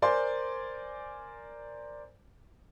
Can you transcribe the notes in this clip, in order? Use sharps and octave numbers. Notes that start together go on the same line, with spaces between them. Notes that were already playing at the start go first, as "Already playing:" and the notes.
A#4 C5 D5 G#5 C6